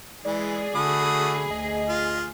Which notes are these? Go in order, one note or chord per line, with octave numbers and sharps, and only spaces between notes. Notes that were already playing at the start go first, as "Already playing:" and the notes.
E3 G#3 G#4 D5
D3 A3 F#4 B5 D#6
D2 D#5
F4 F5